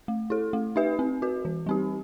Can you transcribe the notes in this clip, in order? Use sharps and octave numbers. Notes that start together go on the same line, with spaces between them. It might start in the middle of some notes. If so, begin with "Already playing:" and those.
A3
E4 A4
A3
D#4 G4 B4 E5
C4
F#4 B4
E3
G3 C4 D#4 G4